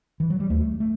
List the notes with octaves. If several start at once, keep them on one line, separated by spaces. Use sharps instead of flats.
E3
F#3
G3
D#2 A3
A3